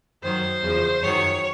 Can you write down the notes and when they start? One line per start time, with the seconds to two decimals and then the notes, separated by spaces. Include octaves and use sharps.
0.23 F#2 D#3 F#3 C5
0.63 E2 C#3 F3
1.02 F#2 D#3 F#3 C#5